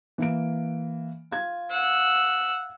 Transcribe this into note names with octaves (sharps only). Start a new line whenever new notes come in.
E3 A#3 D7
F4 G#6
F#5 E6